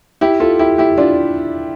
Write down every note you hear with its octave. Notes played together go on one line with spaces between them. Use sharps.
E4 G4
F4 A4
E4 G4
E4 G4
D4 F4